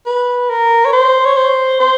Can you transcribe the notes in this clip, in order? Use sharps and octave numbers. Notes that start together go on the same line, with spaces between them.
B4
A#4
C#5
C5
C#5
C5
C5